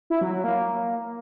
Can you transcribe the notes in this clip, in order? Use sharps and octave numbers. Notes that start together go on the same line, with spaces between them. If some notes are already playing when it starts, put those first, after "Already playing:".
E4
F#3
F#3
A#3